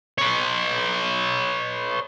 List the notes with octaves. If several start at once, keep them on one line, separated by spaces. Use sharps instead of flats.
B4 C#5